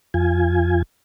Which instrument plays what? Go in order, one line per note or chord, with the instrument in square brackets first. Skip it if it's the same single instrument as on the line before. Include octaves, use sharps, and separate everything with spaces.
[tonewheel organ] F2 F4 G#5